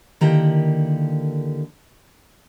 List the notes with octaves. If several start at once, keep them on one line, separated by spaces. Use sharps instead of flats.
D3 D#3 A#3 E4 G4 A#5